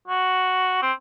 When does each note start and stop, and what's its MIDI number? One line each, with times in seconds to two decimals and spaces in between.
0.08 0.80 66
0.82 0.93 60